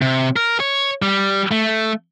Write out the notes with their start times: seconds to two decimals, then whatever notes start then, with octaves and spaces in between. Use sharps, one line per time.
0.02 C3
0.36 A#4
0.60 C#5
1.02 G3
1.51 A3